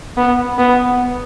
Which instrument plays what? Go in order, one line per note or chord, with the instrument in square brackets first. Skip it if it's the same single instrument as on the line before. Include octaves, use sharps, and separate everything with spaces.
[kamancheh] B3
B3